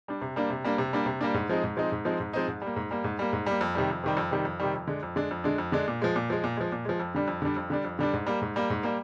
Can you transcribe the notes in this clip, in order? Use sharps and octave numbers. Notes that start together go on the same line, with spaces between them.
G3 D4
C3
G3 A#3 D4
C3
G3 A#3 D4
C3
G3 A#3 D4
C3
G3 A#3 D4
G#2
F3 G#3 C4 D#4
G#2
F3 G#3 C4 D#4
G#2
F3 G#3 C4 D#4
G#2
F3 G#3 C4 D#4
G#2
G3 A#3
G#2
G3 A#3
G#2
G3 A#3
G#2
G3 A#3
F2
C3 D#3 G3
F2
C3 D#3 G3
F2
C3 D#3 G3
F2
C3 D#3 G3
F2
D3 G#3 D4
F2
D3 G#3 D4
F2
D3 G#3 D4
F2
D3 G#3 D4
A#2
F3 G#3
A#2
F3 G#3
A#2
F3 G#3
A#2
F3 G#3
F2
D3 G3 D4
F2
D3 G3 D4
F2
D3 G3 D4
F2
D3 G3 D4
G#2
G3 A#3
G#2
G3 A#3
G#2
G3 A#3